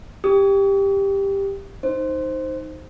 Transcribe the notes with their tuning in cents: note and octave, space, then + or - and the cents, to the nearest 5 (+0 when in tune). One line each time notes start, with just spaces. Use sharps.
G4 +10 D#6 +0
D#4 +0 C5 +0